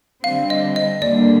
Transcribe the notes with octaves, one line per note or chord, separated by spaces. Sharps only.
D3 G3 C4 F5
D#5
D#5
D#2 D3 G3 A#3 D5